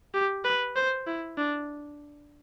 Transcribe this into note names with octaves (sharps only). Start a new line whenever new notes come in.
G4
B4
C5
E4
D4